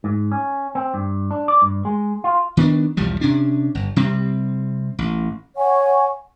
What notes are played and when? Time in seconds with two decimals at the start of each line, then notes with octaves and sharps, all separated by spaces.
0.04 G#2
0.32 C#4
0.75 C4
0.94 G2
1.31 D4
1.48 D5
1.62 G2
1.85 G#3
2.24 F4
2.57 D#3 B3 D4
2.97 B1 E2 F3 G3
3.21 C3 C#4 D4
3.75 G1
3.96 C3 G3 C4
4.99 A1
5.56 C#5 F#5 G#5 C#6